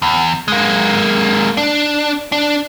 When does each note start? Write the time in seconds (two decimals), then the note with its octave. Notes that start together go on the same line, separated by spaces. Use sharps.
0.02 E2
0.48 G#3 A#3
1.57 D4
2.32 D4